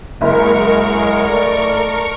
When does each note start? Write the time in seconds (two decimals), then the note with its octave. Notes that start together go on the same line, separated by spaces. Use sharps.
0.21 F#1 F#2 G#3 E4 A#4 C#6
1.28 A3 D5